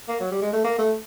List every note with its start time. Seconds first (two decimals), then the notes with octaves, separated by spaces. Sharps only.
0.08 A#3
0.20 F#3
0.31 G3
0.42 G#3
0.53 A3
0.64 A#3
0.78 A3